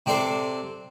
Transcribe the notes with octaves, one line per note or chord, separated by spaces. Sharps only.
C3 C4 D4 A4 C5